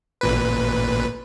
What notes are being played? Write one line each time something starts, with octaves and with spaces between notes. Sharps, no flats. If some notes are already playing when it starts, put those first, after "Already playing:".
A1 A#2 B4